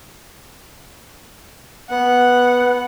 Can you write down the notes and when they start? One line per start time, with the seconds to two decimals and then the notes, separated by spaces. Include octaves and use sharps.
1.90 B3 F#5